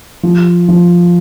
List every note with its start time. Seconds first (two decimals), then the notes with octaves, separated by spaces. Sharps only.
0.23 F3
0.68 F3